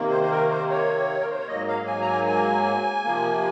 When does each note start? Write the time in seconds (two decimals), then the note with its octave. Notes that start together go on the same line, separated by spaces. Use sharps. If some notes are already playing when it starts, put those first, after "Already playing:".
Already playing: C3 D#3 A#3
0.10 C5
0.23 C5
0.31 A#4
0.50 C5
0.70 C#5
1.20 A#4
1.29 C5
1.38 C#5
1.48 G#2 F#3 A#3 D#5
1.68 F5
1.87 G#5
2.01 A#5
2.07 G#5
2.27 G#5
3.04 C3 F3 A#3